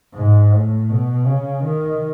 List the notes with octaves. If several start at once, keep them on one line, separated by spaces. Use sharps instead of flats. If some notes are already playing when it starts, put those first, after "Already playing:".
G#2
A2
B2
C#3
D#3